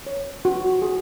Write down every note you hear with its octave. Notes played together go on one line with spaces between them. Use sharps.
C#5
F#4
G#4